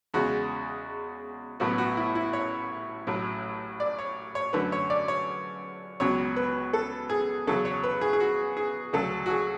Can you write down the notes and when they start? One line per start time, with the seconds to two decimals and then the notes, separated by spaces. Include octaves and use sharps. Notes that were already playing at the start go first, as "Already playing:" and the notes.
0.14 E2 C#3 G#3 C#4 F#4
1.60 A1 A2 F#3 B3 F#4
1.78 F#4
1.97 E4
2.15 E4
2.33 C#5
3.07 A1 A2 F#3
3.80 D5
3.99 C#5
4.35 C#5
4.53 F#2 D3 A3 B4
4.72 C#5
4.90 D5
5.08 C#5
6.00 C#2 B2 F#3 C#4 C#5
6.36 B4
6.73 A4
7.10 G#4
7.47 E2 C#3 F#3 C#4 A4
7.65 C#5
7.83 B4
8.01 G#4
8.13 G#4
8.20 F#4
8.57 G#4
8.93 D2 C#3 F#3 A4
9.26 F#4
9.30 G#4